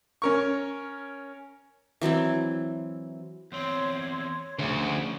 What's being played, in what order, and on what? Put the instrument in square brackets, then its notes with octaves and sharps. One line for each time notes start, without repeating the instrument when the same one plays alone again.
[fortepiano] C#4 A#4 C#6
[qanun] E3 F#3 C4 E4
[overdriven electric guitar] E2 C4 [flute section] C#5 C6
[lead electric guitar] D2 [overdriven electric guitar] C#3 F3 [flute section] G#4